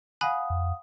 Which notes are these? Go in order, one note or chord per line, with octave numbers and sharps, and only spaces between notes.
F5 F#5 G#5 B5 D#6 F#6
F2